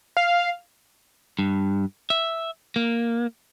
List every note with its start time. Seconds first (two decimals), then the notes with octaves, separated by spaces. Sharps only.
0.17 F5
1.39 G2
2.10 E5
2.76 A#3